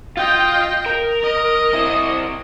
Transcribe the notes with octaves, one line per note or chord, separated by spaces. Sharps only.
F4 D#5 G5
A#4
D#5
C3 E4